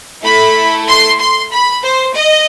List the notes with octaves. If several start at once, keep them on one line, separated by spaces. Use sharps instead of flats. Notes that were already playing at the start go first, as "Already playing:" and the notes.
A3 E4 A4 B5
C6
C6
B5
C5
D#5